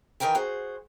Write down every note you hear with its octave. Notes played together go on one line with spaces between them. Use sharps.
D#3 E3 A#4 G5 G#5
F#4 G#4 C5